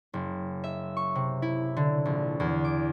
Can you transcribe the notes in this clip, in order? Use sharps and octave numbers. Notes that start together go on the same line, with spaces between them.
F#1
E5
C#6
C3
E4
D3
A#1
E2
D6